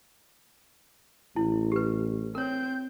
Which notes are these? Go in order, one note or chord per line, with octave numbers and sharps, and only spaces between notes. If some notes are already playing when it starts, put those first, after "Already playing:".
A1 E4
G4 B4
C4 A#4 C#5 G6